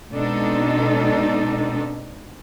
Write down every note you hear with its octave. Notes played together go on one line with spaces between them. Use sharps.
B2 G#3 C4 D4 D#4 A4